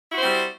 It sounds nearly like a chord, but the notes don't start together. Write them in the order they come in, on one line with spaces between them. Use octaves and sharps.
E4 F#4 C5 C4 G3